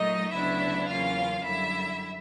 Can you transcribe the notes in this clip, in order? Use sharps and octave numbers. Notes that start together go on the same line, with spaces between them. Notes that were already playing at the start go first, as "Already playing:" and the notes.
Already playing: A#2 F#3 A3 D#4 D#5
D2 C#3 F#3 B3 D4 E4 E5
E2 C#3 F#3 A#3 C#4 F4 F5
F#2 D3 G3 E4 E5